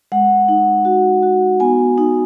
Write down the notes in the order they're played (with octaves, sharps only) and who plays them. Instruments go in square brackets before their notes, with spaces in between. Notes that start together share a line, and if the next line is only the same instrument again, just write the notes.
[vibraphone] G#3 F#5
D#4
F#4
F#4
B3 G#5
D#4